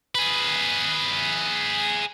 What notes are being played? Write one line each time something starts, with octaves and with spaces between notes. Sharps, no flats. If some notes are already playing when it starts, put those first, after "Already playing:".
G#4 B4